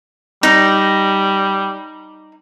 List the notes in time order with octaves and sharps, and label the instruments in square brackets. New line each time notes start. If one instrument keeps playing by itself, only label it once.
[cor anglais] G3 [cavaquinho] D#4